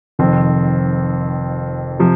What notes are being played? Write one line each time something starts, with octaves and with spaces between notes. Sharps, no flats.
F1 F2 D#3 C4
C3 F3